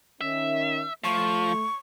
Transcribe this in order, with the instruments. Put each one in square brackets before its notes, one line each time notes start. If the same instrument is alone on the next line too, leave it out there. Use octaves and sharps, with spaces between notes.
[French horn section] D#3 C#4 [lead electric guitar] E5
[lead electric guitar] F3 [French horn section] A3 [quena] C#6